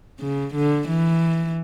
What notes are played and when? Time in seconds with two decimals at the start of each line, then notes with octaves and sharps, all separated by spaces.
0.20 C#3
0.54 D3
0.89 E3